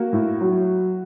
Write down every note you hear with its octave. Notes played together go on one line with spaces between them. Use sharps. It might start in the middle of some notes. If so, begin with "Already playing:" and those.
Already playing: A#3 F#4
A2
F#3